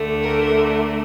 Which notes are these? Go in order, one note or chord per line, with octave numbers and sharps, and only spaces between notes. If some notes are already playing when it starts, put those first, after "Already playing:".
Already playing: D2 D3 A3
A#4